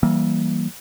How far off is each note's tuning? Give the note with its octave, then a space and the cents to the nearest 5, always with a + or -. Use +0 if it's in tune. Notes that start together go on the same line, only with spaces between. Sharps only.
E3 +0 G3 -25 A#3 +10